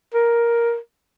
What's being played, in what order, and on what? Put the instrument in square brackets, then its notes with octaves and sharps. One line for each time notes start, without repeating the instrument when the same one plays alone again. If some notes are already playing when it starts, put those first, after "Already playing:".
[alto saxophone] A#4